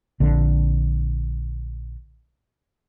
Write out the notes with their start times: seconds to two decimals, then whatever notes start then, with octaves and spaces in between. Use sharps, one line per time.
0.20 A#1 D3